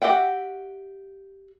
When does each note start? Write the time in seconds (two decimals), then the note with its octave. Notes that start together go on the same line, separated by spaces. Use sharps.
0.02 F#4 G4 E5 F#5 G5